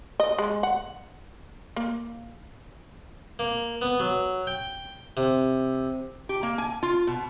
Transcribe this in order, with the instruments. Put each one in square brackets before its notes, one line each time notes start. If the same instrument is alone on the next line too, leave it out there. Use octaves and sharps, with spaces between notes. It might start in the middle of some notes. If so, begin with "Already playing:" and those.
[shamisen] D#5
G#3
F#5
A#3
[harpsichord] A#3
B3
F#3
G5
C3
[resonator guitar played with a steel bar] G4
A#3
G#5
F4
B2